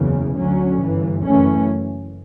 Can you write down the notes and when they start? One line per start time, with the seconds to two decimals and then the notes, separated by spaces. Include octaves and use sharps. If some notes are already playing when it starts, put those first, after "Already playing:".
Already playing: F#1 E2 C#3 E3
0.37 D2 D3 F#3 C#4
0.80 G1 G2 E3
1.24 F#1 F#2 E3 A3 C#4